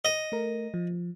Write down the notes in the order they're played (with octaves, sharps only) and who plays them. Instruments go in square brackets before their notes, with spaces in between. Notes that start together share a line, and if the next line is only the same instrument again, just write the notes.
[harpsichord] D#5
[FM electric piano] A3 A#4
F3